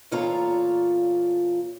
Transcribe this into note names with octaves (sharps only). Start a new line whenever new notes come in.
E2 A#2 F4 A4 C#5 A#5